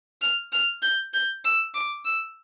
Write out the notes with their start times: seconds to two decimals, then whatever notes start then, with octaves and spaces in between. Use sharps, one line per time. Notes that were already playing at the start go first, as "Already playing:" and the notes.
0.22 F6
0.52 F6
0.82 G6
1.14 G6
1.45 E6
1.74 D6
2.05 E6